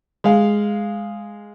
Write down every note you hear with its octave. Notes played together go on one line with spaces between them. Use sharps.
G#3 F5